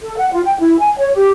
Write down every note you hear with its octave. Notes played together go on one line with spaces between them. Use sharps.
A4
F#5
F4
G5
E4
G#5
C#5
G4